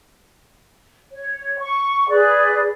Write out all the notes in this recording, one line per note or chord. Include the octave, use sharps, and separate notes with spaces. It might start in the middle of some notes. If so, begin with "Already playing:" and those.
C#5
C#6
G#4 B4 D5